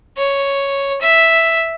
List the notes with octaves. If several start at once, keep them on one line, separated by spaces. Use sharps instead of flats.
C#5
E5